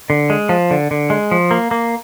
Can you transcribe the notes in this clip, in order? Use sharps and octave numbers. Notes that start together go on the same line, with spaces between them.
D3
G#3
F3
D3
D3
G#3
F3
A#3
A#3